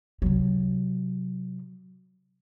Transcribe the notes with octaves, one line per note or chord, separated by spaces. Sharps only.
C3 F#3